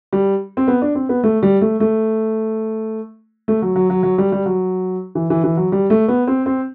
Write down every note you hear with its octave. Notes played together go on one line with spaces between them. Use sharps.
G3
C4
B3
D4
C4
B3
A3
G3
A3
A3
A3
F#3
F#3
F#3
F#3
G3
G3
F#3
E3
E3
E3
F#3
G3
A3
B3
C4
C4